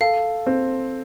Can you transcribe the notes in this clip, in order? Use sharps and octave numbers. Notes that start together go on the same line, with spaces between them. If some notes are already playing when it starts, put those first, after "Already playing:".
A4 F5
C4